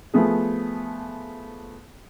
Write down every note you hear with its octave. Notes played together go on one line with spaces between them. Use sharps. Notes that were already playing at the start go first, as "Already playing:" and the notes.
F3 A3 B3 G#4